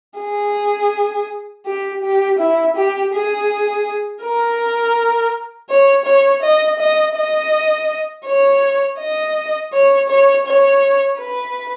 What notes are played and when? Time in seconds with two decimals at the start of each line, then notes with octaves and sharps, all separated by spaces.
0.20 G#4
1.66 G4
2.04 G4
2.39 E4
2.77 G4
3.14 G#4
4.23 A#4
5.70 C#5
6.06 C#5
6.43 D#5
6.79 D#5
7.16 D#5
8.26 C#5
8.99 D#5
9.73 C#5
10.10 C#5
10.47 C#5
11.19 B4